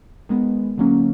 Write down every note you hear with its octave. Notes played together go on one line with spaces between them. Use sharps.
D#3 G#3 B3
D3 F#3 A#3 C#4